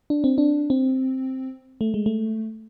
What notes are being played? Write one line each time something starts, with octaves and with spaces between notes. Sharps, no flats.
D4
C4
D4
C4
A3
G#3
A3